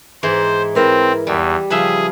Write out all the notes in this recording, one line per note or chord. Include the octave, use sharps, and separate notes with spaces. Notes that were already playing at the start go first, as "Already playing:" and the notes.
G#2 E3 C5
C4 E4 A#4 B4
E2 G3
C#3 F3 G3 G#4 B4 E5